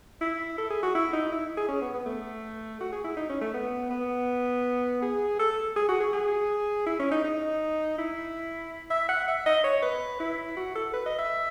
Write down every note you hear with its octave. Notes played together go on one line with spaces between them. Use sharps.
E4
A4
G#4
F#4
E4
D#4
E4
G#4
C#4
B3
B3
A3
F#4
G#4
E4
D#4
C#4
A3
B3
B3
G#4
A4
G#4
F#4
G#4
G#4
E4
C#4
D#4
D#4
E4
E5
F#5
E5
D#5
C#5
B4
E4
F#4
A4
B4
D#5
E5